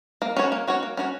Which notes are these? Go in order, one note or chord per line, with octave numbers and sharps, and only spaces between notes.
A#3
C#4 F#4 C#5
A#3
C#4 F#4 C#5
A#3
C#4 F#4 C#5